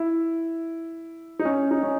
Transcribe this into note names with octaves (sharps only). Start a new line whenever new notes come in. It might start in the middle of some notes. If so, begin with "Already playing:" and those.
Already playing: E4
D#4
C#4
D#4
C#4